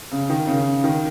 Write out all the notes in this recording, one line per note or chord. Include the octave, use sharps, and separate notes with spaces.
C#3
D#3
C#3
D#3